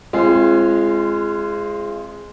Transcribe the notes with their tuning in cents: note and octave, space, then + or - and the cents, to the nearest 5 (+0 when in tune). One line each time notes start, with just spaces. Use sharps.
G#3 +0 C4 +25 F4 -35